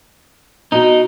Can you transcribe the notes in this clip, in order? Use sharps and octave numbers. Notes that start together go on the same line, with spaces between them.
B2 D#4